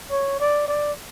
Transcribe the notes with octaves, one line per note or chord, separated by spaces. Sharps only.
C#5
D5
D5